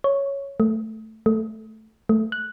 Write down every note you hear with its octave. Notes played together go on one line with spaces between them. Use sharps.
C#5
A3
A3
A3
F#6